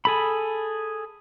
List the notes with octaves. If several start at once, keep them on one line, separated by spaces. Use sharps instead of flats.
G#4 A4 B5